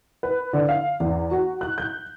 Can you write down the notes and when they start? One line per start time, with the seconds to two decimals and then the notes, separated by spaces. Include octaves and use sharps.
0.23 B4
0.53 D3
0.69 F5
1.00 E2
1.31 F#4
1.61 F#6
1.78 G6